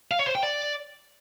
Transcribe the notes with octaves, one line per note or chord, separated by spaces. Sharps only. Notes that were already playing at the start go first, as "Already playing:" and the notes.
F5
C#5
C5
G5
D5